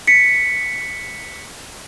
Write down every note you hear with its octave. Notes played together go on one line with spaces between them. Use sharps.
B6 C#7